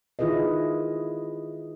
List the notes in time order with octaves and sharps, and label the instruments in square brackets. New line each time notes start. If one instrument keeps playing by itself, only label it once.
[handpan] D#3 E4 F4 G#4 B4 D#5